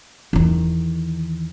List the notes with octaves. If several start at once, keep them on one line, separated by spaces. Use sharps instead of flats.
E2 D#3